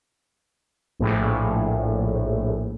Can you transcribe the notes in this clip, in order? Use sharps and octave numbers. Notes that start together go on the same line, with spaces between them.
A#1 A2